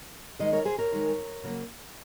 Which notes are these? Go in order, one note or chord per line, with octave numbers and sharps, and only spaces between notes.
D#3 G#3 C5 D#5
A#4 C#5
G#4 C5
A#4 C#5
D#3 G#3
C#3 F#3 A#3